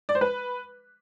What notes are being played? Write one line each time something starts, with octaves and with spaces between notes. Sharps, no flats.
D5
C5
B4